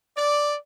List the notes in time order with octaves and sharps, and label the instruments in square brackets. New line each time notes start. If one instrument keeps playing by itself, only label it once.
[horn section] D5